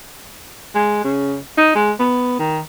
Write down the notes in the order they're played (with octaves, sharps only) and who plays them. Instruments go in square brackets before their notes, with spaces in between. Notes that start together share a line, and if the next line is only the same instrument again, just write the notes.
[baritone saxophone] G#3
C#3
D#4
G#3
B3
D#3